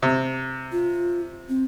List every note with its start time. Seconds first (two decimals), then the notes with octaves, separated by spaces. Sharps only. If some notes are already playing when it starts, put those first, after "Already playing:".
0.02 C3
0.72 F4
1.49 C4